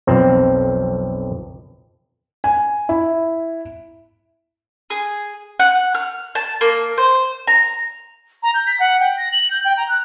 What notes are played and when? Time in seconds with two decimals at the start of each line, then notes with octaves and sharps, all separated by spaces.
0.07 B1 F2 C4
2.44 G#5
2.89 E4
4.90 G#4
5.59 F#5
5.95 F6
6.35 A5
6.61 A#3
6.98 C5
7.47 A#5
8.43 A#5
8.54 G6
8.67 B6
8.80 F#5
9.00 G5
9.17 A#6
9.32 F#7
9.51 G6
9.65 G5
9.77 A#5
9.89 F#6